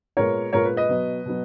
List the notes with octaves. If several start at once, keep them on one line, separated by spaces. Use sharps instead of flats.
A#2 G#3 B3 A#4 C#5
A#2 G#3 B3 A#4 C#5
B4
B4 D#5
B2 F#3 B3
B2 F#3 B3